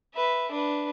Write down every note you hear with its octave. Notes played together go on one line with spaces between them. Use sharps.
B4 E5
D4 B4